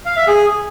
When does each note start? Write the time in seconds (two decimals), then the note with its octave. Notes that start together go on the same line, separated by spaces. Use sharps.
0.06 F5
0.17 E5
0.28 G#4